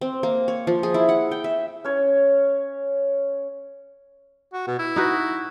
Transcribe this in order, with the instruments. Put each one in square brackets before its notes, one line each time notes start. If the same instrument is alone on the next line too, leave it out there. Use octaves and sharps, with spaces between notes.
[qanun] C4
A#3
C#5
F3
G#4
E4
F#5
G5
E5
[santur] C#4 C#5
[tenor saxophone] F#4
B2
E4
[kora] D#4 F#4 B4